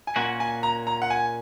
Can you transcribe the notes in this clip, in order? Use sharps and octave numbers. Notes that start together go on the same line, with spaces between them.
G#5
A#2 A#3 C#4 F#4 F#5
G#5
A#5
A#5
F#5
G#5